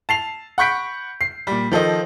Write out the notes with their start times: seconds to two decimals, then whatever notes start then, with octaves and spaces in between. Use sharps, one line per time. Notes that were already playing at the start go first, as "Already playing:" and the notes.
0.09 A5 C7 F7
0.58 F#5 B5 C#6 G6 B6 D7
1.21 C7
1.47 A#2 G3
1.71 D#3 F3 A4 D#5